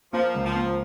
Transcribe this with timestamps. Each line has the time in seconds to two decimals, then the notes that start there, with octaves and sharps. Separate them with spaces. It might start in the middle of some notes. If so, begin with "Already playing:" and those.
0.13 F3 A#3
0.34 C#2
0.46 F3
0.56 A#3